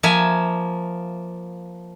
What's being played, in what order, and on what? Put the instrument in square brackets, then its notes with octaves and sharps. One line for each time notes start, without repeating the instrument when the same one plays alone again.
[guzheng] F3 A#3 E5 G#5